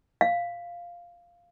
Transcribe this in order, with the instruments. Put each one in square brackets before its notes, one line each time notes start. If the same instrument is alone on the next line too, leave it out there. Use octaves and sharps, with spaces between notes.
[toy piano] F5